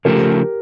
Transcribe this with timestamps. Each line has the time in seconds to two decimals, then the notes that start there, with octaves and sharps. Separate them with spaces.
0.05 C#3 F3 A3 G4 A#4